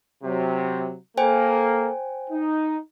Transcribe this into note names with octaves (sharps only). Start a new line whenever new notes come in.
C3 F#3
A#3 A4 C5 G5 G#5
D#4